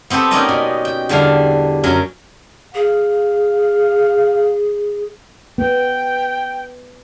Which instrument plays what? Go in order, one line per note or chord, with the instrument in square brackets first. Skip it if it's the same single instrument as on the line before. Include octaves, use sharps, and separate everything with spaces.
[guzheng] B3 C4 G4 A4 C5
A#3 C#4 D#4 A#4 D5 D#5
B2
G5
E2 D3 G3 D4 F5
F#2 F#3 C#4 A#4
[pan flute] G#4 [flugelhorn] F5
[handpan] B3 [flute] G5